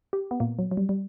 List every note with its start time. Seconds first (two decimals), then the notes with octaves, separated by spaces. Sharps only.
0.13 G4
0.31 B3
0.40 A#2 A#3
0.59 F#3
0.71 F#3
0.77 G3
0.89 G3